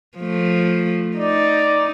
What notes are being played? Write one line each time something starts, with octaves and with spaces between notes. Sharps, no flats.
F3 A3
D#4 D5